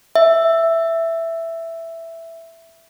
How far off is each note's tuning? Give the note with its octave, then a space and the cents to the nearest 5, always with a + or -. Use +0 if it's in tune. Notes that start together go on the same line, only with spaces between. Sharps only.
E5 +5